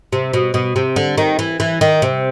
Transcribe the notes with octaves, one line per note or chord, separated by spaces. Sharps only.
C3
B2
B2
C3
D3
D#3
E3
E3
D#3
C3